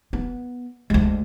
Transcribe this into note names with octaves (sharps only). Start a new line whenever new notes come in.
B3
D2 G#3